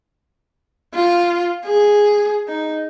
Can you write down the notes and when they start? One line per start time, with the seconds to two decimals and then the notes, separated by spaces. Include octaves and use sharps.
0.94 F4
1.66 G#4
2.48 D#4